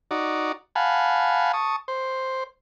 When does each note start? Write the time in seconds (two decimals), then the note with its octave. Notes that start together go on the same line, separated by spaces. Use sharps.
0.11 D#4 F#4 D5
0.76 F5 F#5 G#5 A5 B5
1.53 A5 C#6 D#6
1.88 C5